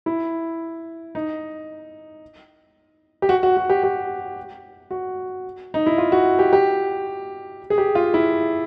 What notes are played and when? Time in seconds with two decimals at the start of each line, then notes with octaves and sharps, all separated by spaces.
0.06 E4
1.15 D#4
3.22 G4
3.29 F#4
3.43 F#4
3.57 F#4
3.70 G4
3.83 G4
4.91 F#4
5.74 D#4
5.86 E4
5.98 F4
6.12 F#4
6.39 G4
6.53 G4
7.70 G#4
7.78 G4
7.95 F4
8.14 E4